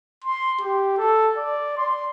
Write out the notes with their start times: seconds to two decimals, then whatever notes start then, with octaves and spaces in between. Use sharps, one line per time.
0.25 C6
0.60 G4
0.98 A4
1.37 D5
1.77 C6